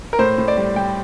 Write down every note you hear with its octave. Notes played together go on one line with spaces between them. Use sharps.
A#4
A2 C5
A2
D5
G3
G3 G5